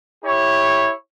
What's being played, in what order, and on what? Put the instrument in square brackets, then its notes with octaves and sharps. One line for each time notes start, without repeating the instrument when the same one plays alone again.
[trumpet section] E4 G4 C#5